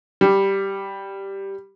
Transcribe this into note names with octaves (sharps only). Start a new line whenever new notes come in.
G3